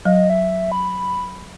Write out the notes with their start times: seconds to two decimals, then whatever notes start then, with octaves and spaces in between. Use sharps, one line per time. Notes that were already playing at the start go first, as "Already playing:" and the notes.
0.05 F#3 D#5
0.30 E5
0.72 B5